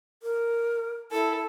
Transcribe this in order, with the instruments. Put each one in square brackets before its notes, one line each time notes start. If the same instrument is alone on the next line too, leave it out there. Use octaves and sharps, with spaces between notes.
[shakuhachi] A#4
[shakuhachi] E4 [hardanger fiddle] A4